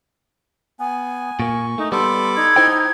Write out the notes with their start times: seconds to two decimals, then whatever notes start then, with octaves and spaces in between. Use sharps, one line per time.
0.80 B3 G#5
1.40 A#2 A#3 C#6
1.78 A3 D#4
1.92 G3 B3 A4 B5 C6 D6
2.36 D#4 G#6
2.56 D#4 E4 C5 G5